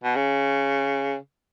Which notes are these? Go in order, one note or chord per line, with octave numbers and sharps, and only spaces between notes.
B2
C#3